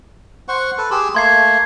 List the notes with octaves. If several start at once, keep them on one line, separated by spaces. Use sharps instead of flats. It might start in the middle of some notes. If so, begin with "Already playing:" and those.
C5 F#5 C#6
A4 B4
G4 G#4 C6 E6
A3 A#3 C6 G#6 C7